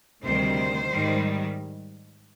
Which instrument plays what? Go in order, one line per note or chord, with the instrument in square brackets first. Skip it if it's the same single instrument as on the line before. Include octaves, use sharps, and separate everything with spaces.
[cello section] D2 C3 D#3 G3 C5
G#2 D#3 G3